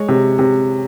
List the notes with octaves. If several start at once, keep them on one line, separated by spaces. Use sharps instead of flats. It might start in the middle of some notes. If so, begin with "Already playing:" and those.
Already playing: G#3 C#5
C3
C3